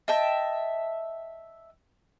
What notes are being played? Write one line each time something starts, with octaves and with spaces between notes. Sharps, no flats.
D#5 E5 G5 A5